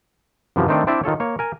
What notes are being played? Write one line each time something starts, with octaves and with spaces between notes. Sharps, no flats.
F#2 C3 E3 F3
D#3 A3 C4 D4 A4
C4 D4 E4 D5 E5
D#3 F4 A4 C#5
A#3 C#5
A#4 G#5